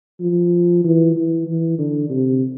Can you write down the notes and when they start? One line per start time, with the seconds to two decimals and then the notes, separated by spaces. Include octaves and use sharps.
0.21 F3
0.84 E3
1.16 E3
1.47 E3
1.79 D3
2.10 C3